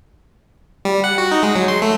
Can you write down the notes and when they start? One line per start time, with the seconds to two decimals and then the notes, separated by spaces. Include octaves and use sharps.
0.85 G3
1.04 F#5
1.18 F#4
1.31 D#4
1.43 G#3
1.56 F#3
1.68 C6
1.82 A3